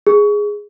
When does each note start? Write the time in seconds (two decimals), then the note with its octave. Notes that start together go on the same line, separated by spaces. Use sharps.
0.07 G#4